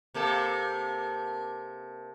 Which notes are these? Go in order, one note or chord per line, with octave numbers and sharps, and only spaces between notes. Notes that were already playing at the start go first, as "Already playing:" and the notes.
C3 A#3 A4